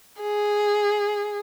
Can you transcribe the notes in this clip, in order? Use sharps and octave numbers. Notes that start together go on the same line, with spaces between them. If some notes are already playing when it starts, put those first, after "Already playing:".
G#4